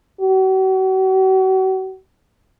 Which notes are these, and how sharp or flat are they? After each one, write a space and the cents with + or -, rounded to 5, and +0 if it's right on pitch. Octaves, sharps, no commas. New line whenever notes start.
F#4 +40